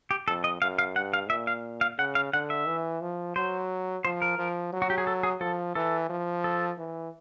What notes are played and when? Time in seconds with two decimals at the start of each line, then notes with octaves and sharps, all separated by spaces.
0.11 G4
0.28 F2 A4
0.44 D#5
0.62 F#2 F5
0.79 F5
0.96 G2 F#5
1.13 F5
1.30 A#2 E5
1.47 F5
1.81 F5
1.99 C#3 F#5
2.15 F5
2.33 D3 F#5
2.50 E5
2.67 E3
3.01 F3
3.36 F#3 C5
4.05 F3 C5
4.22 A#4
4.38 F3
4.73 F#3
4.82 F#4
4.90 G4
4.98 G#4
5.07 A4
5.23 G#4
5.41 F3 A4
5.75 E3 A4
6.10 F3
6.44 A4
6.78 E3